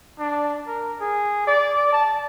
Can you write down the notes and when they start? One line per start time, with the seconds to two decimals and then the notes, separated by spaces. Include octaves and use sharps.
0.19 D4
0.67 A#4
1.01 G#4
1.47 D5
1.92 A5